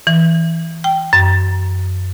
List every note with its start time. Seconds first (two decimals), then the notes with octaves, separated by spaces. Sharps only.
0.07 E3
0.84 G5
1.13 F#2